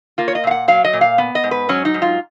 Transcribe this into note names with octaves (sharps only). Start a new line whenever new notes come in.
A#3 F4
C#5
D#5
A#2 F5
F#5
F#3 F5
D#5
A#2
F5
B3
D#5
G#2
B4
F#3 C#4
D#4
G#2
F4